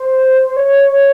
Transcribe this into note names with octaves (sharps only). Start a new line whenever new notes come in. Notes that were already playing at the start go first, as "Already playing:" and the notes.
Already playing: C5
C#5